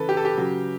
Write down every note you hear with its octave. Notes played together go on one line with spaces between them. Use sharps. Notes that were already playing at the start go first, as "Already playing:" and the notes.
Already playing: C#3 E3 A4 B4
G4
A4
G4
C#3 F#3